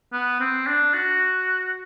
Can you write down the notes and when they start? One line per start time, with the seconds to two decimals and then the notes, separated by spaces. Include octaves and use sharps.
0.13 B3
0.40 C4
0.67 D4
0.94 F#4